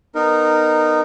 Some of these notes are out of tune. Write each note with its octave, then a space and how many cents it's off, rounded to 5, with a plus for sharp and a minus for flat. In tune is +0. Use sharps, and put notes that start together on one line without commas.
B3 +0 D#4 -15 A#4 -5